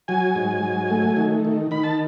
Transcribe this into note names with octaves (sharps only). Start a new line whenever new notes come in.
F#3 G#5
G#2
F#3
A3
D#3
D#3
D#3 B5
A5